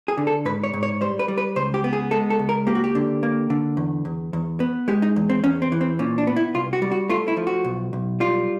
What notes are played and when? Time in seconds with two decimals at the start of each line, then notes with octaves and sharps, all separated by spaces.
0.08 G#4
0.17 D3
0.27 A4
0.45 G#2 B4
0.64 C#5
0.73 G#2
0.83 C#5
1.01 G3 C5
1.19 B4
1.28 G3
1.38 B4
1.56 C#2 C5
1.74 G4
1.84 B3
1.93 G#4
2.11 G#3 A4
2.30 A4
2.39 C#2
2.49 A#4
2.67 A#3 G4
2.75 F#4
2.84 G4
2.95 D3
3.23 A#3
3.50 D3
3.77 E2
4.05 E2
4.33 E2
4.60 B3
4.88 G#3 G4
5.02 D#4
5.16 E2
5.30 C4
5.44 E2 C#4
5.62 C4
5.72 E3
5.81 C4
5.99 A#2 C#4
6.18 D4
6.27 B3
6.36 E4
6.54 C2 F4
6.73 F#4
6.82 G3
6.92 F#4
7.09 A3 F4
7.28 E4
7.37 F3
7.47 F#4
7.64 B1
7.93 B1
8.20 G3 F4